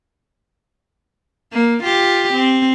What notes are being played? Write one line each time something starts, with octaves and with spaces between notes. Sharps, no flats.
A#3
F4 G4
C4